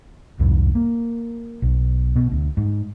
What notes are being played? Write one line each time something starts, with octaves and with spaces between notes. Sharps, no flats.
C2 F2 G#2
A#3
B1
B2
D2
G#2